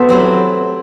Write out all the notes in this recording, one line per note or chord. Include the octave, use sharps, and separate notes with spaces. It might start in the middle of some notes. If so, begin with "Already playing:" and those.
Already playing: A3 B3 C5 E5
F#3 C4 E4 G4